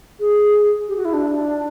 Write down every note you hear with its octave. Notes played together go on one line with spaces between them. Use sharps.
G#4
G4
F#4
E4
D4